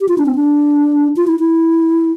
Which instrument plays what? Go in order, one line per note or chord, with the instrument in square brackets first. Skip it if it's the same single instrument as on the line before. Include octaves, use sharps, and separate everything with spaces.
[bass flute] G4
F4
D4
C4
D4
F4
E4
E4